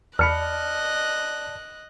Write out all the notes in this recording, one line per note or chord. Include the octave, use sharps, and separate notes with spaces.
E2 D5 D#5 A5 B5 F6 F#6 C#7